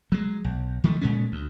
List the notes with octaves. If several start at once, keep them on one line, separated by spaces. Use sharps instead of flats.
F#3 G#3
B1
D#3 F3 A3
A#2 G#3 A3 C#4
D2